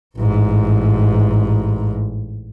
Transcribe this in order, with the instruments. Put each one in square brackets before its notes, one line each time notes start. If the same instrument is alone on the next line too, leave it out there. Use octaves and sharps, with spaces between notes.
[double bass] A1 G#2